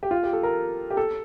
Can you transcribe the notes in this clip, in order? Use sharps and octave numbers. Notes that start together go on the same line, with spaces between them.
G4
F4
G4
A4
A#4
G4
A4